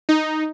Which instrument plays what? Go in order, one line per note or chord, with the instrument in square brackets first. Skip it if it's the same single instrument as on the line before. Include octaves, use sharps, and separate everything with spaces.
[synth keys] D#4